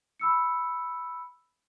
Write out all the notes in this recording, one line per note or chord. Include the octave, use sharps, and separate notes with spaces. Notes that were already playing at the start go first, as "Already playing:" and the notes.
B5 E6 C#7